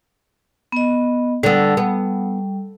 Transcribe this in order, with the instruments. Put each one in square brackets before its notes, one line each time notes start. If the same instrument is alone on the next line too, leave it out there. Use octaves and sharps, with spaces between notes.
[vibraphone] B3 D#5
[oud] D3 B3 [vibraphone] G3
[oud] B3